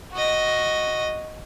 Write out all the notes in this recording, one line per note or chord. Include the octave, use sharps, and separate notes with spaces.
F#4 D#5